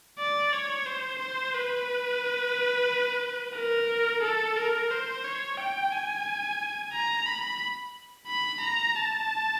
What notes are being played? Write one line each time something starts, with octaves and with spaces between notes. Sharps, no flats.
D5
C#5
C5
C5
B4
A#4
A4
A#4
C5
C#5
G5
G#5
A#5
B5
B5
A#5
A5